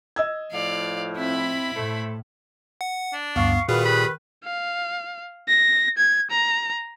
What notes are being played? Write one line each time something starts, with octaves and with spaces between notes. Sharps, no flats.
D#5 E6 G#6
A2 F3 D5 F5
C4 E4 B5
A2 A3 A4 C5
F#5
D4
D2 G2 B3 F5 C#6
A#2 D#3 F#4 G#4 B4 F5
G4 B5
F5
A#6
G#6
A#5